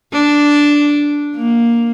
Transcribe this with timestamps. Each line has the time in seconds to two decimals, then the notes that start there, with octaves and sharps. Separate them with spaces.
0.13 D4
1.36 A#3